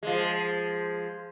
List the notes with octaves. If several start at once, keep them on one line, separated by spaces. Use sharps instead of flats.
F3 G#3